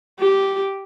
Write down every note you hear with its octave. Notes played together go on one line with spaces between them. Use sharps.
G4